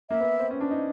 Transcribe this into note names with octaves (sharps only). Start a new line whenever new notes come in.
A#3 E5
B3
C4
C#4
D4
D#4